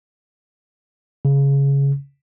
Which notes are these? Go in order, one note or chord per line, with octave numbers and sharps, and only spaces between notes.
C#3